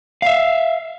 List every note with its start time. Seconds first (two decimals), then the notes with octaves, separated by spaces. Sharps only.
0.22 E5 F5